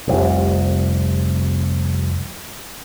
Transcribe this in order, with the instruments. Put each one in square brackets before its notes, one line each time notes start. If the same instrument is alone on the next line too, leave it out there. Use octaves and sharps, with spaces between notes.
[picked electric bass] F1 C2